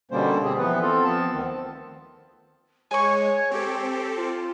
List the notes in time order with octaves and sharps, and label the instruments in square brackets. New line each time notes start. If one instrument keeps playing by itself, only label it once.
[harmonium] B2 D3 G3 A#3 C#4 C5
C4 G4 G#4
E3 F3 B3 B4
C4 F4 A4
F3 B3 C4 A5
D2 D#3
[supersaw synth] G#3 [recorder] C#5 [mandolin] G#5 C#6
[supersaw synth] C4 A4 [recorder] G4
[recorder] F4